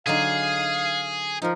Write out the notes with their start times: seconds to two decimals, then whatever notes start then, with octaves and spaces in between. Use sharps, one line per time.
0.07 D3 F#3 D#4 G#4 F5
1.42 F3 D#4 A#4